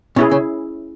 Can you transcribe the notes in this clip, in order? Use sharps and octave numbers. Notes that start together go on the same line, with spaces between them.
B2 C#4 E4 G#4
C#3